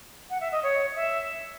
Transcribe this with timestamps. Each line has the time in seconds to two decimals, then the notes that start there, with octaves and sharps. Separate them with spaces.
0.30 F#5
0.41 E5
0.52 D#5
0.63 C#5
0.96 E5